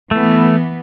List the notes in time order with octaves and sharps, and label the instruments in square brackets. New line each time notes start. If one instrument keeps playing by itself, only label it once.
[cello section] E3 B3 [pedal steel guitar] A3